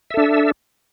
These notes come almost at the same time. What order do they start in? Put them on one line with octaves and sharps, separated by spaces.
E5 A4 D4